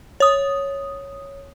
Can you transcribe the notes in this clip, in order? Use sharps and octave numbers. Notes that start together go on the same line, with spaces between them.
C#5 D#6